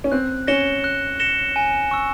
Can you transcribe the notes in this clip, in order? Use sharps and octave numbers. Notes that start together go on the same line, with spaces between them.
C#4
C4 F#6
C#4 A#6 C#7 E7 G7
F#6
A#6 C#7 E7 G7
G#5
C#6 E6